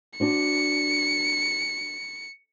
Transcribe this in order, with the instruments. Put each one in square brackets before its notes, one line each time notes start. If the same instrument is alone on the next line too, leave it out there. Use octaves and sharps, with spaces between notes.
[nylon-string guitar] D4 F#4 C5 [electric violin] C#7